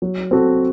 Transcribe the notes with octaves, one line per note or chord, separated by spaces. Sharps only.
F#3
C4 F#4 A4